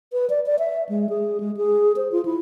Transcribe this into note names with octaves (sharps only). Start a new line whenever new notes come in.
B4
D5
D5
E5
G#3
G#4
G#3
G#4
C5
F4
E4